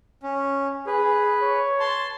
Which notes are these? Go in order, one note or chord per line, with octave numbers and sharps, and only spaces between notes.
C#4
G#4 B4
C#5
A5 C6